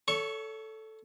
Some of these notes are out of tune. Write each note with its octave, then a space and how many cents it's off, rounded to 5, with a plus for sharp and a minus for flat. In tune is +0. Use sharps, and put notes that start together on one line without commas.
A4 +0 C#5 +35 C#6 +0